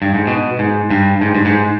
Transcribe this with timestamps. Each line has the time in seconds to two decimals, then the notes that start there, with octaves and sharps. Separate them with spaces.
0.02 G2
0.14 G#2
0.27 B2
0.59 G#2
0.90 G2
1.21 G#2
1.35 G2
1.45 G#2